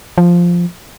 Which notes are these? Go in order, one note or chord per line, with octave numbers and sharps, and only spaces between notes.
F3